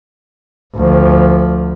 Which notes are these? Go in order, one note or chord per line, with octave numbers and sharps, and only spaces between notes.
D2 F3